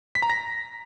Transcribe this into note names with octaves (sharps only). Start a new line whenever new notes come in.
B6
A#5
A#6